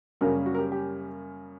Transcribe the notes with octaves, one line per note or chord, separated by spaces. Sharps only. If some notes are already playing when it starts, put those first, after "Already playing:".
F#2 C#3 G3 A#3 C#4 F#4 A#4
F#4
A#4
G4
G4